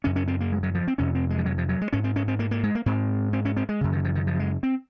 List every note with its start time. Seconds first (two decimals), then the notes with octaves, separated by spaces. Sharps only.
0.04 F#2 C#3 C#4
0.16 C#4
0.28 C4
0.40 A#3
0.52 G#3
0.63 F#3
0.75 F3
0.87 C4
0.98 F2 C3 C#4
1.15 C4
1.30 G#3
1.38 F3
1.46 F#3
1.58 F3
1.69 F#3
1.81 G#3
1.93 G#2 C#4
2.04 C4
2.16 C#4
2.28 C4
2.39 A#3
2.51 A#3
2.63 G#3
2.75 A#3
2.86 G#2 C4
3.33 C4
3.45 C#4
3.57 C4
3.69 G#3
3.81 F#2 C#3
3.93 D#3
4.05 F3
4.15 D#3
4.27 F3
4.39 G#3
4.63 C4